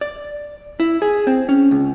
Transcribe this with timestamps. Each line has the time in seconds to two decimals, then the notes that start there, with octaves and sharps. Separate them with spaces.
0.01 D5
0.80 E4
1.02 G#4
1.27 C4
1.49 C#4
1.71 C#2